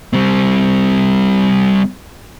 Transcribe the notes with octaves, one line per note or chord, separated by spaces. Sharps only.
G3 C4